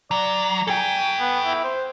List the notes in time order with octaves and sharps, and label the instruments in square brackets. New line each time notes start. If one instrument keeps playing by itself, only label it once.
[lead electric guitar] F#3 [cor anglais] D5
[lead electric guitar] A4 G5 [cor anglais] G#5
[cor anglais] B3
E4
C5